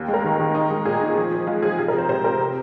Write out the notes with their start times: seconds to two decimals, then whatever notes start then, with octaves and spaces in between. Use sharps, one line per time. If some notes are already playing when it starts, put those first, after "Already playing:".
Already playing: D#2
0.08 G#3
0.14 A#4
0.24 D#3
0.40 D#3
0.55 D#4
0.70 G#3
0.85 A#2 G#4
1.01 D#4
1.16 F3
1.32 F3
1.47 G#3 F4
1.62 F3 G#4
1.78 C3 F4
1.88 A#4
1.94 F3 C5
2.09 C3 C5
2.24 C3 A#4
2.40 C3